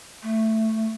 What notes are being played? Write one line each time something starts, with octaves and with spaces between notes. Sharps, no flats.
A3